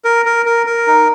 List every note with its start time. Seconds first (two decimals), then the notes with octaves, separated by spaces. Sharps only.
0.04 A#4
0.25 A#4
0.46 A#4
0.67 A#4
0.87 D#4